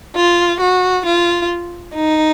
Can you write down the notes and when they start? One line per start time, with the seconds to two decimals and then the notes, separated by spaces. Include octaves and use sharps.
0.15 F4
0.60 F#4
1.05 F4
1.95 D#4